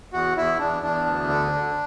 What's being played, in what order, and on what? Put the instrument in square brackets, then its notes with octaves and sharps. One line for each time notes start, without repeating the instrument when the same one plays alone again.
[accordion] E2 F#4
E2 E4
E2 D4
E2 D4
D2
D3
D3